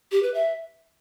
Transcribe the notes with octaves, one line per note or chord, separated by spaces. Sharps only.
G4
B4
E5